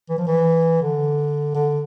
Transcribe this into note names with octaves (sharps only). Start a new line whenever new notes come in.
E3
F3
E3
D3
D3